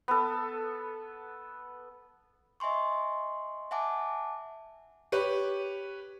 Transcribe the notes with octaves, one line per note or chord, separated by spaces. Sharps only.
B3 A4
D#5 E5 G#5 C6 C#6
E5 F#5 G#5 A5 D6
G4 B4 C#5